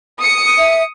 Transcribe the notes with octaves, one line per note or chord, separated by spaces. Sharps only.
D#6 C#7
E5